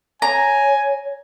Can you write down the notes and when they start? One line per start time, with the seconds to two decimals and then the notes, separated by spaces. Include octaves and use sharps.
0.22 C#5 G#5 A#5